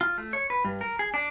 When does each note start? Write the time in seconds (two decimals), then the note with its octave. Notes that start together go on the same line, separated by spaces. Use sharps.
0.01 F4
0.18 A3
0.33 C#5
0.50 B4
0.65 G2
0.81 A#4
0.99 G#4
1.14 D4